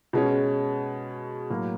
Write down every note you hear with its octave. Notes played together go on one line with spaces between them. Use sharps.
B2 G#3 C#4
A2 F#3 A#3